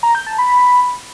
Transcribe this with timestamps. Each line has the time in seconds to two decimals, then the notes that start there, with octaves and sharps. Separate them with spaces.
0.03 A#5
0.15 G6
0.27 A5
0.38 B5